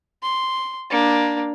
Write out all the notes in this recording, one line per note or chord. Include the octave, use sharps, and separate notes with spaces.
C6
A#3 D4